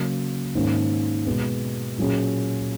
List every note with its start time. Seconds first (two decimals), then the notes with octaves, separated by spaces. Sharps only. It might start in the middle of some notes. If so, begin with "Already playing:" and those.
Already playing: C#3 F#3 A#3
0.55 G#2 D#3 A#3 C#4
1.27 B2 G#3 B3
1.98 A#2 F#3 A#3 C#4 G#4